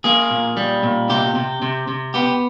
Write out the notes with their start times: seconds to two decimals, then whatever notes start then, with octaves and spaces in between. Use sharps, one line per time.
0.04 A#3 G#4
0.31 A#2
0.57 G3
0.83 A#2
1.09 C3 G4
1.35 C3
1.62 C3
1.88 C3
2.14 B3 G4